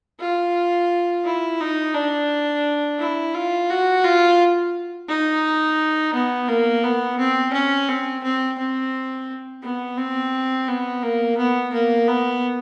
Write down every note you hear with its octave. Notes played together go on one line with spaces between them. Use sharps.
F4
E4
D#4
D4
E4
F4
F#4
F4
D#4
B3
A#3
B3
C4
C#4
C4
C4
C4
B3
C4
B3
A#3
B3
A#3
B3